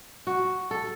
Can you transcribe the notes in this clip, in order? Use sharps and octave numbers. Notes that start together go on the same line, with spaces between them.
F#4
A4